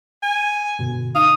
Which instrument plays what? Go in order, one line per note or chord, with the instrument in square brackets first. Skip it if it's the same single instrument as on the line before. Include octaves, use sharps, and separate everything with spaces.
[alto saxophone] G#5
[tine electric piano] G2 B2 D3
[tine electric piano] D#4 [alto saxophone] F5 [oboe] D#6